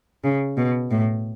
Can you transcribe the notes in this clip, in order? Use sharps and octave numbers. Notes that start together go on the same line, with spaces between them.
C#3
B2
A2